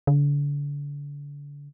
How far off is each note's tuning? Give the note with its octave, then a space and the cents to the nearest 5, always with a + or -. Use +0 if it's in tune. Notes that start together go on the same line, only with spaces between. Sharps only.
D3 -35